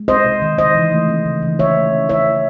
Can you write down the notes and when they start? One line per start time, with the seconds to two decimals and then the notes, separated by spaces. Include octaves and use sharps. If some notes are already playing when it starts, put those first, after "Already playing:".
Already playing: G#3
0.08 C4 C5 D#5
0.25 C3
0.42 D#3
0.58 C#3 C5 D#5
0.75 E3
0.91 A3
1.08 C4
1.26 C#3
1.42 E3
1.59 E3 C#5 E5
1.76 A3
1.92 C#4
2.09 E4 C#5 E5
2.26 E3